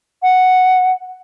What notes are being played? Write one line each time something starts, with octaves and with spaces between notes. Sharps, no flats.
F#5